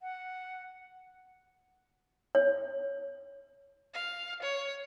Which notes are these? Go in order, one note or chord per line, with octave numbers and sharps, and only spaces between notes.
F#5
C#5
F5
C#5